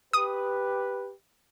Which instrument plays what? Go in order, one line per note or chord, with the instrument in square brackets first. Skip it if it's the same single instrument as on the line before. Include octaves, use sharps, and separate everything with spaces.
[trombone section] G4 B4 [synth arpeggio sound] D#6